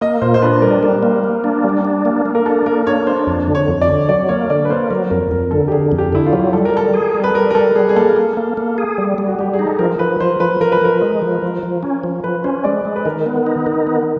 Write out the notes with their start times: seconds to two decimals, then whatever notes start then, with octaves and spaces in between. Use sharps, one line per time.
0.01 A#3 D#5
0.22 A#2 C5
0.34 C5
0.42 D4 B4
0.62 G3 A#4
0.83 G3 A#4
1.03 A#3
1.24 A#3
1.44 D4
1.64 G3
1.85 D4
2.05 A#3
2.26 A#3
2.35 A#4
2.46 D4 A4
2.66 A#3 A#4
2.86 D4 C#5
3.07 D4 C5
3.27 F2
3.48 D3
3.55 C#5
3.68 F2
3.81 D5
3.88 D3
4.09 F#3 D5
4.29 A#3 C#5
4.50 D3 D5
4.65 B4
4.70 A#3 C5
4.90 F#3 A#4
5.11 F2 A#4
5.31 F2 A#4
5.51 D3 A4
5.68 G4
5.72 D3 G#4
5.92 F2
5.98 G4
6.13 D3 E4
6.26 F4
6.33 F#3
6.53 G3 A4
6.65 A#4
6.74 G3 A4
6.94 G#4
7.14 G3
7.24 B4
7.35 G3 A#4
7.50 A#4
7.55 G3 A4
7.75 G3 G#4
7.89 G#4
7.96 A#3 A4
8.16 A#3
8.37 A#3
8.57 A#3
8.78 G#4
8.98 G3
9.18 G3
9.27 F#4
9.39 G3 G4
9.53 G#4
9.59 D#4
9.67 A4
9.79 F3 A#4
9.99 F3 B4
10.20 F3 C5
10.40 F3 B4
10.61 F3 A#4
10.72 B4
10.81 F3 A#4
11.01 G#3
11.22 F3
11.42 F3
11.63 F3
11.83 C#4
12.04 F3
12.24 F3 B4
12.44 C#4 C5
12.64 G#3 D5
12.85 G#3
12.96 B4
13.05 D#3 A#4
13.26 B3
13.46 D#4
13.66 D#3
13.87 B3